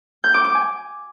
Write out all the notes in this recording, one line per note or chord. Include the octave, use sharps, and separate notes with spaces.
G6
D6
D6
G#5